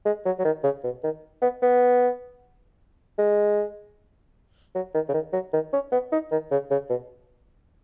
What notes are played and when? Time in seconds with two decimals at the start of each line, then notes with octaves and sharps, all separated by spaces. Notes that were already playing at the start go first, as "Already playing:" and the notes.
0.05 G#3
0.25 F#3
0.39 F#3
0.45 D#3
0.63 C#3
0.84 B2
1.04 D#3
1.42 B3
1.62 B3
3.18 G#3
4.75 F#3
4.94 D#3
5.09 C#3
5.13 D#3
5.33 F#3
5.53 D#3
5.73 C#4
5.92 B3
6.12 D#4
6.31 D#3
6.51 C#3
6.71 C#3
6.89 B2